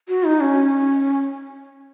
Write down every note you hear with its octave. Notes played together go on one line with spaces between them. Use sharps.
F#4
D#4
C#4